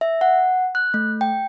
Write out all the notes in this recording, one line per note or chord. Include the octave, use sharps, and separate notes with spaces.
E5
F#5
F#6
A3
G5